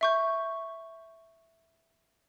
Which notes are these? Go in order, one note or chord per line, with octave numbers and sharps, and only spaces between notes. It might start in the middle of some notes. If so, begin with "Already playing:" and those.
E5 C#6 G6